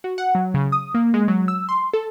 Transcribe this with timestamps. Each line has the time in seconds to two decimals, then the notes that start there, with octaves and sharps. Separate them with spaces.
0.04 F#4
0.18 F#5
0.35 F#3
0.54 C#3
0.72 D#6
0.94 A#3
1.14 G#3
1.28 F#3
1.48 E6
1.69 C6
1.93 A4